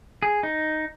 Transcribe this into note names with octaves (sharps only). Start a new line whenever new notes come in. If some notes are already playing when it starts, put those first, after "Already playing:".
G#4
D#4